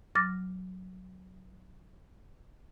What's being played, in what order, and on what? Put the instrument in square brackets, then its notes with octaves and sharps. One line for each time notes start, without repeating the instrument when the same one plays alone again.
[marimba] F#3 D6 F6 A6 A#6